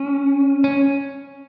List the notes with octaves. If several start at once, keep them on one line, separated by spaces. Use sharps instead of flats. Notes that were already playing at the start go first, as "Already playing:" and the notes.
Already playing: C#4
C#4